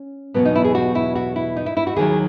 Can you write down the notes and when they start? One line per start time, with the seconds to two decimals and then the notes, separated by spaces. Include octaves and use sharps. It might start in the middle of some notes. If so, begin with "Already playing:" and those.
Already playing: C#4
0.34 E2 B2 F#3 B3
0.45 D#4
0.56 E4
0.64 G#4
0.75 F#4
0.95 E4
1.15 F#4
1.36 E4
1.56 D#4
1.66 E4
1.77 E4
1.87 F#4
1.96 D#2 D#3 F#3 G#4